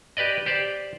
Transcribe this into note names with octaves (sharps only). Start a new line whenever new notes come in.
G4 B4 D5 D#5
G4 C5 D5